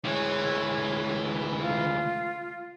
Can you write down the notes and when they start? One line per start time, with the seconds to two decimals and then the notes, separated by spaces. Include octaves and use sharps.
0.05 D2 E3 G#3 C#5
1.61 F4